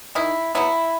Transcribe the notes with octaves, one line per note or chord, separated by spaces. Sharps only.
D#3 E4
F#3 B3 E4